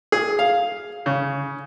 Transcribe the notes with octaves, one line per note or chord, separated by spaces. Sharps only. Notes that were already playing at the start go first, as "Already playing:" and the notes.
G#4
F5
C#3